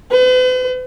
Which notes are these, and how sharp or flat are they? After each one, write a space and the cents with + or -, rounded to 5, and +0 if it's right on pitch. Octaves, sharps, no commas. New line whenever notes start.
B4 +45